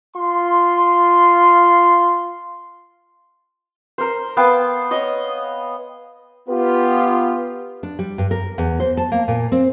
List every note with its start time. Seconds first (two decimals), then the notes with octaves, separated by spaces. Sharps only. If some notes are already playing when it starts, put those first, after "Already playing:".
0.15 F4 C6
3.98 A#4 C5
4.37 B3 F5 G5 A5
4.91 C#5 D#5
6.49 B3 F4 G4 B4
7.83 D4
7.99 G3
8.18 G2
8.31 A#4
8.58 E2
8.80 C5
8.97 A5
9.12 A#3
9.28 A#2
9.52 C4